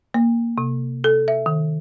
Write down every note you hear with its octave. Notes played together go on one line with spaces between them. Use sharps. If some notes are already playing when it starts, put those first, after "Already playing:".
A#3
C3
A4
E5
D#3